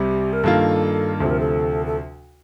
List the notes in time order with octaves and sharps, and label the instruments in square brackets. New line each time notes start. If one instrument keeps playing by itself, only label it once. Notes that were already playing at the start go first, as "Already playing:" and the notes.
Already playing: [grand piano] C2 C3 G3 [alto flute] G4
[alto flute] A#4
[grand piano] G2 D#3 A#3 F4 [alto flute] A4
[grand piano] D2 C3 F3 [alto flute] A4
[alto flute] A#4
A4
A4